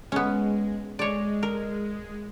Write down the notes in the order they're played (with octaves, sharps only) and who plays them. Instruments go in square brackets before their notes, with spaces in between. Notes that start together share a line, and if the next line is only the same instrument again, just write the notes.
[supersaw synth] G#3 [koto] B3 C#4
[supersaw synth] G#3 [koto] C#5 D5
[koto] A#4